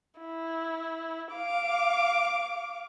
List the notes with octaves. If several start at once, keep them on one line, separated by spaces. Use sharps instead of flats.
E4
F5 D6